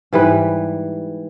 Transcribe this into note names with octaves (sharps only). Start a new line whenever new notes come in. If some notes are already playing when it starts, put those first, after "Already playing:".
G#2 E3 G3 B4